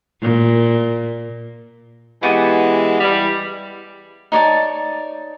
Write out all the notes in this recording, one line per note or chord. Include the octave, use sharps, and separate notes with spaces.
A#2
E3 G#3 B3 F#4 G4
E3 G3
D#4 C#5 D5 A5